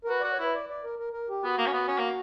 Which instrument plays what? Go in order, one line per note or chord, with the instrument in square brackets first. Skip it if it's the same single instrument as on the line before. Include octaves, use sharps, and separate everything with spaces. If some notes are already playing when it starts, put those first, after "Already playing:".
[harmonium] A#4
[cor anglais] F#4 [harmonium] B4
[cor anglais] F#4 [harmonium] D5
[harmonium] C#5
[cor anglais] E4 [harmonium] B4
[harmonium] D5
D5
A#4
A#4
A#4
G4
[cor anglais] B3 [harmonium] F#4
[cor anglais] A#3
C#4
B3
C#4
A#3